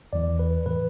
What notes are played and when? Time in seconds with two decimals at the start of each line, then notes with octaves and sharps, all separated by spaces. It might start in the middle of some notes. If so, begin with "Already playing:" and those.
0.13 E2 E3 D5
0.39 B4
0.66 A2 E3 B4